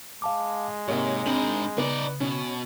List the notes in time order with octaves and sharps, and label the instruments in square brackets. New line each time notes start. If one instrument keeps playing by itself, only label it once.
[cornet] G#3 [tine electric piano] F5 A5 D6
[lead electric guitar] G#2 [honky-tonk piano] C3 A#3 C#5 [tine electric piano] G4
[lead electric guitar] G#2 A#4 [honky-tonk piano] C4 D#7 F#7 [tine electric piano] D4 B5
[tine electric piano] C#3 [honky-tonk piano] B3 [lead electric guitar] D#4 D5
[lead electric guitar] B2 [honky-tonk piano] C#4